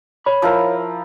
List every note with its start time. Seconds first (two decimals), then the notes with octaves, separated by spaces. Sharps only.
0.26 C#5 B5
0.42 F3 E4 A#4